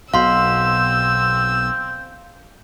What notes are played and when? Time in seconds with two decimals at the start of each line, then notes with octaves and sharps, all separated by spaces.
0.14 B1 B2 C4 F5 C6 E6